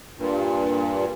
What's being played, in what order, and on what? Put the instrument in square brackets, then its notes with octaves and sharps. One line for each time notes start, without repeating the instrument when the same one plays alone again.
[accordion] G2 A#2